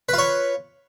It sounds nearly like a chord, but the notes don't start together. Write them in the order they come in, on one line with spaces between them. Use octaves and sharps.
B4 F4 C#5